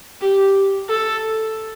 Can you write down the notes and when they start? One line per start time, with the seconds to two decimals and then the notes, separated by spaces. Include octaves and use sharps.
0.21 G4
0.89 A4